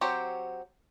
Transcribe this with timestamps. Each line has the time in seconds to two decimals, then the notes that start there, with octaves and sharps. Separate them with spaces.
0.01 F#3 C4 G4 C5 C#5